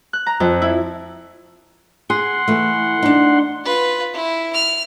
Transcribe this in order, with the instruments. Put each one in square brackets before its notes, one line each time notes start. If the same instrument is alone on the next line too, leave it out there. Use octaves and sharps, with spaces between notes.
[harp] F#6
A#5
F2
E4
[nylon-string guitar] G#4 [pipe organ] F#5 C6
[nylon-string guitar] E3 A3
D4 D#4
[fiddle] F4 B4
E4
F6